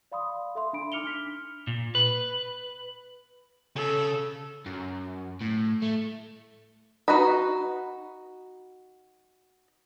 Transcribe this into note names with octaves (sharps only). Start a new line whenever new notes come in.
D5 F5 B5 C6 D#6
A4 E5 C6
D4 B5 D7
D#4 D6 F6 C#7 F7 G7
D4 F6 B6
A#2
B4
C#3 A4
F#2
A2
A3
D#4 F#4 B4 D#5 B5